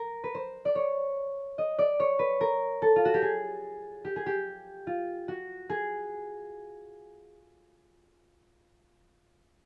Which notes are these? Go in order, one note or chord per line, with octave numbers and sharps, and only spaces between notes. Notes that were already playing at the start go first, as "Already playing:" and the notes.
Already playing: A#4
B4
C5
D5
C#5
D#5
D5
C#5
B4
A#4
A4
F4
F#4
G4
G#4
G4
G#4
G4
F4
F#4
G#4